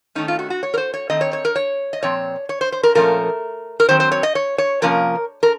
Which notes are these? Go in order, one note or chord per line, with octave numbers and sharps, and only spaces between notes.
D#3 A3 C#4 D#4
F4
F#4
F#4
C#5
A#4
C5
C#5
D#3 A3 C4 D#5
C#5
C#5
A#4
C#5
D#5
A#2 F3 C4 C#5
C#5
C5
C5
A#4
A#2 F3 A3 C#4 A#4
A#4
D#3 F#3 C4 C5
C5
C#5
D#5
C#5
C#5
C3 F3 A#3 C#4 A#4
A#4